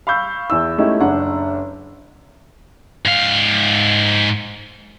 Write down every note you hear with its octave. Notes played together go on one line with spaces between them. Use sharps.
F5 B5 C#6 E6 G6
E2 E4 E6
G#3 A3 C#4 D#4 E4 G4
F#1 D4 F#5
G#2 F5